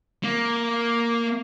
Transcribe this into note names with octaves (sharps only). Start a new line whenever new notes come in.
A#3